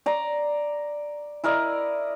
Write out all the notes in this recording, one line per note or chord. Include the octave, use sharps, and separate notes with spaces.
D5 A#5
E4 A#4 D5 D#5